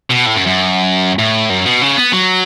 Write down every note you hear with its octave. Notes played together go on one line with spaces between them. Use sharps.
B2
A2
F#2
F#2
A2
F#2
B2
C#3
B3
F#3